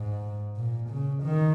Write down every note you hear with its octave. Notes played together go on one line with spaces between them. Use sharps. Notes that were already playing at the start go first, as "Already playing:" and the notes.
Already playing: G#2
A#2
C#3
D#3